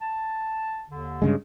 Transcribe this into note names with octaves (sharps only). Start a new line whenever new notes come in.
A5
D#2 D3
G2 C#3 G#3